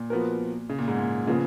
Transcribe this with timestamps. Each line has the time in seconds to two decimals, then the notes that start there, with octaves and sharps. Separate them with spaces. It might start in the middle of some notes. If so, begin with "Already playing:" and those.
Already playing: A#2
0.10 F3 B3 F#4 A#4
0.69 C#3
0.79 A#2
0.88 G#2
0.98 A#2
1.27 A#2 C#3 F3 B3 F4 G#4